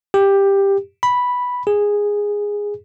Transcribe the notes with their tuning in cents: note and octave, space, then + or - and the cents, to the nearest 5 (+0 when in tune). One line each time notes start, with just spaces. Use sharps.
G4 +10
B5 -5
G#4 -10